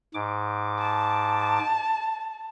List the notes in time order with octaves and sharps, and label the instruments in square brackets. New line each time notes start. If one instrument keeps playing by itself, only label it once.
[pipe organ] G#2 D6
[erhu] A5